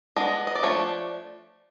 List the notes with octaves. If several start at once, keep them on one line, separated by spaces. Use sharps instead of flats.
G#3 B3 D4 D#5
D#5
D5
F3 A3 D4 C#5